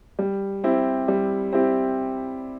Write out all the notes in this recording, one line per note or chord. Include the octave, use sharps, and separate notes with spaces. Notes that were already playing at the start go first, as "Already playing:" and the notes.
G3
C4 E4 G4
G3
C4 E4 G4